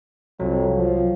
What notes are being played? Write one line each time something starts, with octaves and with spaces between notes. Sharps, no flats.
C2 F2 F#3
F3